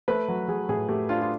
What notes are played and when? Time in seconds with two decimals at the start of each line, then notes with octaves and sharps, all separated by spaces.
0.08 A3 B4
0.28 F#3
0.48 F#3 G#4
0.69 A2 G#4
0.89 A3 G4
1.09 D4 F4
1.22 F4